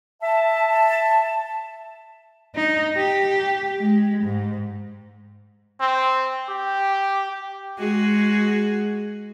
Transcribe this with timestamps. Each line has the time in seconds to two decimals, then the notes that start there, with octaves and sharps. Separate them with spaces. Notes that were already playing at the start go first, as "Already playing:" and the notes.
0.22 E5 A5
2.55 D#4
2.96 G4
3.79 G#3
4.24 G#2
5.80 C4
6.49 G4
7.78 G#3 F#4 G#4